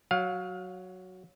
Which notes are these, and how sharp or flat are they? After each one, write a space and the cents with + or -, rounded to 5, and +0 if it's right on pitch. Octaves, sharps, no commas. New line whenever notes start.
F#3 +0 F5 +25